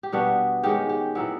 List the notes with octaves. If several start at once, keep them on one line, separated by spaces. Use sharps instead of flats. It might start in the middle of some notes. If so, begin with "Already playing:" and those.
G4
B2 G3 B3 D4 F#4
D#3 G#3 C#4 G4
G4
A#2 F#3 B3 E4